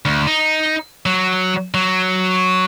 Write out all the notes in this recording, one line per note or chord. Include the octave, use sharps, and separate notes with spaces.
D2
D#4
F#3
F#3